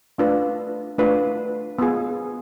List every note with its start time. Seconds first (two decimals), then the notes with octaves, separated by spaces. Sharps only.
0.18 A3 D4 F4 B4
0.98 A3 D4 F4 B4
1.79 B3 F4 G#4